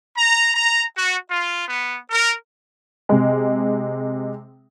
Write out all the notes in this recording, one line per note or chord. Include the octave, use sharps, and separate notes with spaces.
A#5
A#5
F#4
F4
B3
A#4
C3 G#3